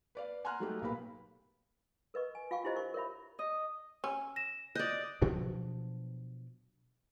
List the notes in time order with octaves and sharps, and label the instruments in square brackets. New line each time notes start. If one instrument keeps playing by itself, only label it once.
[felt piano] B4 D5 F5
F#5 G#5 A#5 C6 F6 F#6
F#3 G3 A3 D#4 G4
B1 A#2 A#4 B4 F5 B5
[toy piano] A#4 B4 D#5 C#6
G#5
F4 F5 G5 C#6
D4 E4 G4 C5 D#5
A#4 C#6
A#4 C#5 E5 B5
[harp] D#5
[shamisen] C#4 [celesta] E6
[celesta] A#6 E7
[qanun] D5 D#5 [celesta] F#6 G6
[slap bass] B2 F3 F#3 D4